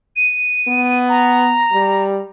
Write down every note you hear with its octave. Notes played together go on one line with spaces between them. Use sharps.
D#7
B3
A#5
G3